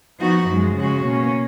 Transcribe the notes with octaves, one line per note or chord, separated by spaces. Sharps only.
F3 B3 D#4 F#4
F#2 F3 G#3
C#3 G#3 C#4 F#4
B2 A#3 C#4